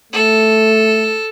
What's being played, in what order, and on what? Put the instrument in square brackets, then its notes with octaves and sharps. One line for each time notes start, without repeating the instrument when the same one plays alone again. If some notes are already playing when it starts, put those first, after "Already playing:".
[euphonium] A3 [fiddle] A4